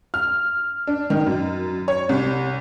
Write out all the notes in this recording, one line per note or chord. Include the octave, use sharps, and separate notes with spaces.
F6
D4
D#3
F#2
C#5
C2